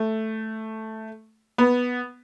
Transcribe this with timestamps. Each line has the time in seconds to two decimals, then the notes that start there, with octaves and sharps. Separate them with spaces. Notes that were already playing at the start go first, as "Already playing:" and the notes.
Already playing: A3
1.58 B3